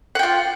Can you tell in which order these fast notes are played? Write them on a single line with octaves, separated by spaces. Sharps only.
F#5 G5 F4